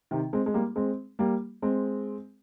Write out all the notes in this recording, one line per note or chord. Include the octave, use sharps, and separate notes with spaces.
C3 D#3
G#3 C4
G#3
G3 A#3
G#3 C4
G3 A#3
G#3 C4